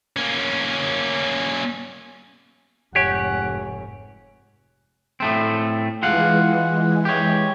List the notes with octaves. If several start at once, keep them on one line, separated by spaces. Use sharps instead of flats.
A#3 C#4
F1 G#2 G4 C#5 F#5 G#5
A2 A3 C4
E3 G#3 F4 F5 F#5
G4 C#5